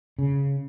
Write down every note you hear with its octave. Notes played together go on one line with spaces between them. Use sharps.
C#3